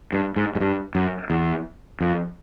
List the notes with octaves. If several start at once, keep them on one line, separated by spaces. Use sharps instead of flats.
G2
G#2
G#2
G2
F#2
E2
F2